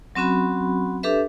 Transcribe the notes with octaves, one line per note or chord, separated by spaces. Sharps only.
F#3 C4 C#4 F#4 B5
D4 G4 A4 B4 E5